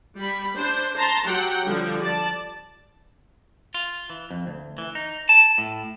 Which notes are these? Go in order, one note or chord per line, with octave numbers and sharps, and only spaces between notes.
G3 B5
D4 C5
A5 A#5 C6
F#3 G4 F#5 G5
D3 F3 G3
D5 A5
F4
E3
F2
D2
E3
D#4
A5
A2